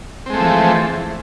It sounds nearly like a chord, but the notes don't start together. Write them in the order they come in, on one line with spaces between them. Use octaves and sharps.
C4 G#3 A3 F3 E3